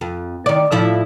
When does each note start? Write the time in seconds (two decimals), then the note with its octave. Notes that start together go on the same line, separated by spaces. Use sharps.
0.01 F2
0.46 D#3 D5
0.71 A2 F3 E4